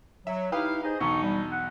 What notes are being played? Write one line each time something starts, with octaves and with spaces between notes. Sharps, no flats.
F#3 E5
D#4 E4 G4 B4 F5 D#6
D#4 G#4 C5 D#5
B1 E2 G#3 D4 D#4 C#6
G3
F#5